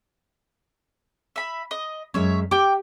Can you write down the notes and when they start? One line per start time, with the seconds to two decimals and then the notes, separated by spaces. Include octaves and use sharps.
1.36 E5 B5
1.71 D#5
2.14 F#2 G#3 C#4 C#5 E5
2.51 G4 G5 D6